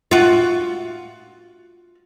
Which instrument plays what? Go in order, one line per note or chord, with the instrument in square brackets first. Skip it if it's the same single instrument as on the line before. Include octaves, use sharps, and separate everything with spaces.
[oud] F4 F#4